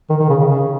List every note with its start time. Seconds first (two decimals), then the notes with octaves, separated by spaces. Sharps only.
0.10 D#3
0.20 D#3
0.30 C#3
0.40 C#3
0.50 C#3